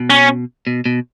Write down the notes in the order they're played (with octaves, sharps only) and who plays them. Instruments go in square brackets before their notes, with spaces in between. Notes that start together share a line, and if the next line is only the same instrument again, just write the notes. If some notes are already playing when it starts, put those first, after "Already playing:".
Already playing: [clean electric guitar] B2
[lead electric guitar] C#4
[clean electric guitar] B2
B2